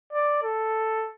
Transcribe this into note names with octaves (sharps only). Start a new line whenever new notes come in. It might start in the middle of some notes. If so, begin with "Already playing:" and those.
D5
A4